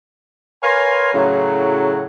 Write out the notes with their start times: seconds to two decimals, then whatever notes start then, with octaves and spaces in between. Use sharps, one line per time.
0.63 A#4 B4 C#5 F5 G#5 C6
1.13 A2 C#3 F#3